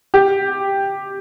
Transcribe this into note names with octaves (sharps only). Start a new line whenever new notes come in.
G4